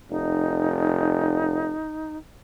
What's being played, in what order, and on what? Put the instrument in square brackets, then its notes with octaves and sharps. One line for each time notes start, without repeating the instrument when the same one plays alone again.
[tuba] F1 [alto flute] D#4